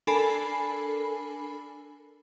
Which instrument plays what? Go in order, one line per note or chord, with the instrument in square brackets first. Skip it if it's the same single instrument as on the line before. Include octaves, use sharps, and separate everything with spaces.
[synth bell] D4 A4 A#4 G#5 B5 C7